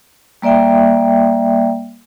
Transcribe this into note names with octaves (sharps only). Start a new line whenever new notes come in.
G3 A#3 D5 E5 G5